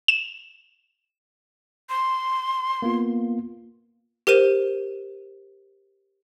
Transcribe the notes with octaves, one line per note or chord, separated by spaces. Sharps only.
E7
C6
A#3 B3 F4
G4 A#4 C5 D#7 E7